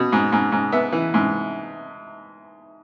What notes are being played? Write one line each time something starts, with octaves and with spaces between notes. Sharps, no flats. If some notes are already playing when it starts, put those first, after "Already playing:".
Already playing: B2
G#2
G#2
G#2
B3 E5
E3
G#2